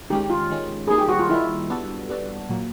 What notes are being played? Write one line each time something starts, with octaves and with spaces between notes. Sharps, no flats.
D#3 G#3 C#4 G4
F4
D#3 G#3 C#4
D#3 G3 A#3 D#4 G#4
G4
F#4
F4
D#3 G3 A#3 D#4 E4
G3 B3 D4 F#4 A4
G3 B3 D4 F#4 A4
A#2 F#3 A#3